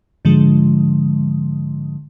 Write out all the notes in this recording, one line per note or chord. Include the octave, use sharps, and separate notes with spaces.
G#2 D3 F3 G#3